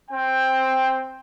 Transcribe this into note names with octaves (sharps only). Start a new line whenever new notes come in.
C4 G5